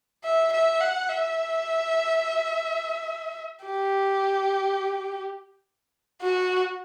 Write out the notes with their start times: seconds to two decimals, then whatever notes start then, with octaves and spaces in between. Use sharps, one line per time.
0.24 E5
0.53 E5
0.81 F#5
1.09 E5
3.65 G4
6.21 F#4